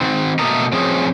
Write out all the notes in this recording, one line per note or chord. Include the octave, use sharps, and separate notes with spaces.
D#3 C4
B2 A3 A#3 A4 D#5 A#5
F3 C4 C#4 G#4